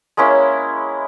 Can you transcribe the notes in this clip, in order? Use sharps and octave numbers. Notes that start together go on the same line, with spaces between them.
G#3 A#3 C#4 E4